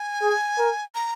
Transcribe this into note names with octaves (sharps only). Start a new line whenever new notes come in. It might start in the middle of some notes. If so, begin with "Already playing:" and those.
Already playing: G#5
G#4
A#4
A#5